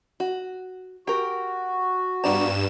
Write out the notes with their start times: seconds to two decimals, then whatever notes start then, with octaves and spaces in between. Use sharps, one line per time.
0.20 F#4
1.07 F#4 G4 A#4
2.24 G2 B3 D5 A#5 E7